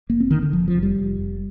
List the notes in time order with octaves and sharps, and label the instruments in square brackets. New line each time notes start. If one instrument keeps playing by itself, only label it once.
[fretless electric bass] F1 A#3
C4
D3 D#3
D3
F1 F3
F3
F1
G3
F1
F1